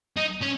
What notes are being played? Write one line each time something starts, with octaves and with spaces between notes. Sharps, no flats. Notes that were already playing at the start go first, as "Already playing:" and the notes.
D#4
C#4